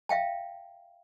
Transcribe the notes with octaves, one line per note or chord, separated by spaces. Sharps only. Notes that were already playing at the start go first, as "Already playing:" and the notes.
E5 F5 G5 A5